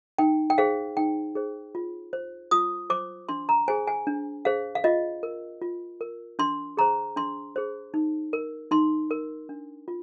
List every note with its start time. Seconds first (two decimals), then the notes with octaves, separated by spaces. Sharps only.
0.18 D#4 G5
0.50 G5
0.58 G#4 C5 F5
0.97 D#4 G5
1.35 G#4 C5
1.75 F4
2.13 C5
2.51 F4 D#6
2.90 C5 D6
3.29 D4 C6
3.49 A#5
3.68 G#4 C5 G#5
3.87 G#5
4.07 D4
4.45 G#4 C5 F5
4.75 F5
4.84 F4 D#5
5.23 A#4
5.61 F4
6.01 A#4
6.39 D4 C6
6.77 G#4 C5 A#5
7.16 D4 C6
7.56 G#4 C5
7.94 D#4
8.33 A#4
8.71 D#4 C6
9.11 A#4
9.49 D4
9.88 F4